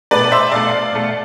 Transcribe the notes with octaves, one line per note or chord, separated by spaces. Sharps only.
B2 A3 B4 D5
C5 E5
B2 A3 D5 F5
B2 A3